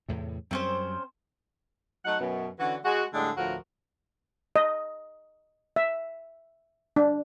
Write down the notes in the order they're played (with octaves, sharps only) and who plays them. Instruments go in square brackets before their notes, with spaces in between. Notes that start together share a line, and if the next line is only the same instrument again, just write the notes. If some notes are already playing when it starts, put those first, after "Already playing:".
[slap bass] E2 A2 C3
[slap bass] F#2 G3 [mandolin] C4 C#4 C5
[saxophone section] F#3 A3 D#4 F#5
F#2 B2
D3 E3 C#4 F#4
G#3 F#4
A2 D3 G3 G#3 D4 G#4
D2 A2 F3 F#4 A#4
[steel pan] D#5
E5
D4